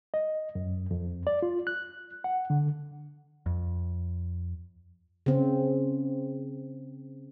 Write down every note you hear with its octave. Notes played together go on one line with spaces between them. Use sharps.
D#5
F#2
F2
D5
F4
F#6
F#5
D3
F2
C#3 C4